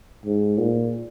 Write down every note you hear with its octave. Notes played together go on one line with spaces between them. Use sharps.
G#2
A#2